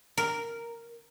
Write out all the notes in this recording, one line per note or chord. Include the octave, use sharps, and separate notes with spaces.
A#4